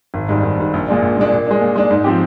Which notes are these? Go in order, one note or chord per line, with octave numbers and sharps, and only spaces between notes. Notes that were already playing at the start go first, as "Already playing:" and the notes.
G#1
G#2 G3
G#1
G#2 G3
A#1
A#2 G#3 D4
A#1
A#2 G#3 D4
A#2
G#3 D4
A#2
G#3 D4
G#2
F3 C4 G4